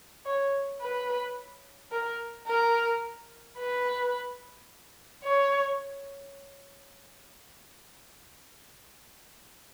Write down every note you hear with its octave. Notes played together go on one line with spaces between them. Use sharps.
C#5
B4
A#4
A#4
B4
C#5